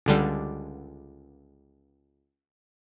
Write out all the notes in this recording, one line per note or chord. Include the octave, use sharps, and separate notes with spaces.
C#2 D3 G3